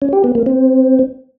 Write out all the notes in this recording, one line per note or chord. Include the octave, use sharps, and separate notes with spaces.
C#4
G4
B3
A#3
C4